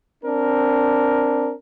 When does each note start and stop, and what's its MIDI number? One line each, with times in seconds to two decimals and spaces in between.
0.24 1.52 60
0.24 1.52 62
0.24 1.52 70